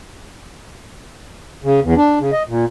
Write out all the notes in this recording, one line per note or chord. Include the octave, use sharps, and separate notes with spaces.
C#3
E2
D4
C#3
D#5
A#2